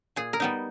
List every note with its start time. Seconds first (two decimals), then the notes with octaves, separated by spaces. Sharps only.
0.16 A#2 G#4
0.33 A#4
0.40 G3 B3 D#4